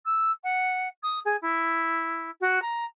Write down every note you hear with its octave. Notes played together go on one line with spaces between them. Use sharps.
E6
F#5
D#6
G#4
E4
F#4
A#5